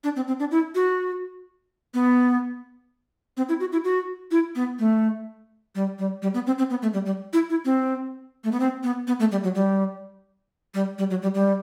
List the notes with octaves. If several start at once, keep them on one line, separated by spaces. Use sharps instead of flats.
D4
C4
C4
D4
E4
F#4
B3
C4
E4
F#4
E4
F#4
E4
B3
A3
G3
G3
G3
B3
C4
C4
B3
A3
G3
G3
E4
E4
C4
A3
B3
C4
B3
B3
A3
G3
F#3
G3
G3
G3
F#3
G3
G3